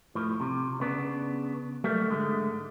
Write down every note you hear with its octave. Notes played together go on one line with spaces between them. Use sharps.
A2 F3
C3
C#3 B3 D4
F#3 G3 A3 A#3
G#2 D3 G#3 A3